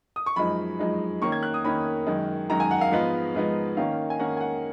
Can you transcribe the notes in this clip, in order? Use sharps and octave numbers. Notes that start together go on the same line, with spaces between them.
D#6
C#6
F#2 F3 G#3 D#4 B5
F#2 F3 G#3 D#4
D#3 A#3 C#4 C#6
G#6
F#6
D#6
D#3 A#3 C#4 B5
F#2 D#3 G#3
F#2 D#3 G#3 A#5
G#5
F#5
F5
G#2 F3 G#3 B3 D#4
G#2 F3 G#3 B3 D#4
D#3 A#3 C#4 F5
G#5
D#3 A#3 C#4 F#5
G#5
F#5